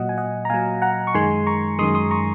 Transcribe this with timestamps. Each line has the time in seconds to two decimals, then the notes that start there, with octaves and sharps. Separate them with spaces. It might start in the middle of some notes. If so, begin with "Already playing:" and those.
Already playing: A#2 F#3 D#5 F#5
0.09 G#5
0.18 D#5 F#5
0.45 A#5
0.50 A#2 F#3 F5 G#5
0.82 F#5 A#5
1.07 C#6
1.14 F#2 D#3 G#3 G#5 C6
1.47 A#5 C#6
1.79 F#2 D#3 G#3 C6 D#6
1.95 C6 D#6
2.11 A#5 C#6